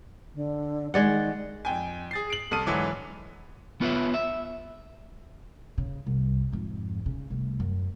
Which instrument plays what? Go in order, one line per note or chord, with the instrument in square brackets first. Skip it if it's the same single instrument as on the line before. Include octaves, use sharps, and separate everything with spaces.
[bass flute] D3
[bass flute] D#3 [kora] G#3 D5 F#5
[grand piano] F2 G5 G#5
G#4 A6 C7
D7 F#7
C2 A4 D#6 F6 D#7
G#2 D3 E3 F#3 D6
[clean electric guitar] B3 F4 B4 C#5 E5
E5
[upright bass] C#3
C2 F#2
F2 G#2
C#3
C2 A3
F#2